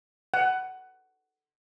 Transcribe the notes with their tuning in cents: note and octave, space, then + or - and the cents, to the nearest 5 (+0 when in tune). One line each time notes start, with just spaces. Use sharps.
F#5 +15